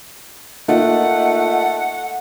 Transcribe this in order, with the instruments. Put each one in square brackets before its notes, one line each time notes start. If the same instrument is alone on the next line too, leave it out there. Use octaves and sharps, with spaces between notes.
[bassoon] A3 [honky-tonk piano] A#3 D#4 F4 [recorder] F#5